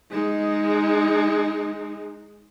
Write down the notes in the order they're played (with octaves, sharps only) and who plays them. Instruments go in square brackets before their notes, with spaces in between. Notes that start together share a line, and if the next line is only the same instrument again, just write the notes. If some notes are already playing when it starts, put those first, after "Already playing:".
[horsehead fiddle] G#3 D#4